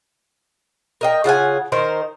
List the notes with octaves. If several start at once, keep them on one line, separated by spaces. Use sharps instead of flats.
A#4 D#5 G5
C#3 F4 F#5 G#5
D#3 A#4 C5